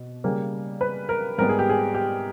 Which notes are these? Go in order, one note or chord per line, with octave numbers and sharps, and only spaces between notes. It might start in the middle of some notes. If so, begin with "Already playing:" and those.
Already playing: B2
C#3 G3 A#3
B4
A#4
G#2 G3 B3 A#4
G#4
G4
G#4
G4